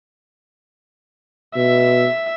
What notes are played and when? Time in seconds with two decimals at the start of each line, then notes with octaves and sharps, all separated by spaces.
1.56 B2 E5